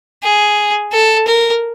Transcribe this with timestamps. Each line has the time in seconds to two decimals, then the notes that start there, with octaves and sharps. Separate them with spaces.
0.23 G#4
0.92 A4
1.27 A#4